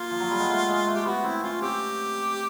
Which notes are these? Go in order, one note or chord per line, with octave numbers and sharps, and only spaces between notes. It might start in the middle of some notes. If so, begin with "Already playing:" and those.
Already playing: A#3 F4
F3
F#3
G3
G#3
A3
G#3
A3
G4
B3 F#4
C4 E4
C#4 F4
C4 G4